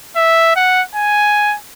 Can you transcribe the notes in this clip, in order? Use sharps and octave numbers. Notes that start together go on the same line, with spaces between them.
E5
F#5
G#5